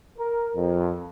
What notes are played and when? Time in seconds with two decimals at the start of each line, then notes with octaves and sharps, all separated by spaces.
0.18 A#4
0.55 F2